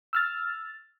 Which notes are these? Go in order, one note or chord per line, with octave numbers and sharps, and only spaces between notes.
E6 F6 A6